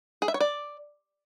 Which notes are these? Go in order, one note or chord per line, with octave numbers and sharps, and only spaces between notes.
G#4
E5
C#5
D5